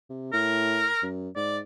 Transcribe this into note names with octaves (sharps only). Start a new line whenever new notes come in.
C3
A2 A#4
F#2
G#2 D5